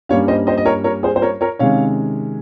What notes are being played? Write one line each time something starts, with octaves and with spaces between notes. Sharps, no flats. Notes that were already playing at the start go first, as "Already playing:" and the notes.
G2 G3 A#3 C#4 C#5 F5
C5 D#5
C5 D#5
D#5
A#4 C#5
A#4 C#5
G#4 C5
C5
A#4 C#5
A#4 C#5
C3 D#3 G#3 C#4 C#5 F5